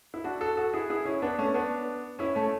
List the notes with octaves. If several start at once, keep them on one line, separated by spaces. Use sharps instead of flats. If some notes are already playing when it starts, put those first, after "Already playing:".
E4
D4 F#4
F#4 A4
F#4 A4
E4 G#4
E4 G#4
C#4 E4
B3 D4
A3 C#4
B3 D4
C#4 E4
A3 C#4